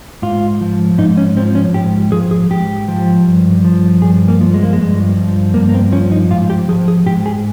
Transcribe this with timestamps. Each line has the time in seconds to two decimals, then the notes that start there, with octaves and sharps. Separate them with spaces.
0.22 G#2 F4
0.61 F3
0.98 G#2 D#4
1.17 C#4
1.37 F3 C4
1.55 C#4
1.74 G#2 G4
2.12 F3 G#4
2.31 G#4
2.50 G#2 G4
2.88 F3
3.27 G2
3.64 F3
4.02 G2 G#4
4.28 A#3
4.41 F3
4.54 G#3
4.63 A#3
4.73 G#3
4.79 G2
5.17 F3
5.54 G2 A#3
5.69 A#3
5.74 C4
5.92 F3 C#4
6.12 D#4
6.30 G#2 F4
6.50 G4
6.69 F3 G#4
6.88 G#4
7.06 G#2 G4
7.26 G#4